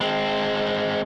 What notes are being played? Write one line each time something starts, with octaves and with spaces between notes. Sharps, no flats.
G#3 C4